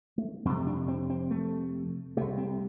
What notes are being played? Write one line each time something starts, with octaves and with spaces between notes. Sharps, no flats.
A3
F2 C3 C4
D4
C4
C4
A3
C2 C3 A3
C4